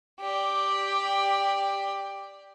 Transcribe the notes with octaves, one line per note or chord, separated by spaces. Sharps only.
G4 D5